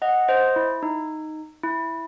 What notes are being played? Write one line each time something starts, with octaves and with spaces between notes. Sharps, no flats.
D#5 F#5
C5 D#5
E4
D#4
E4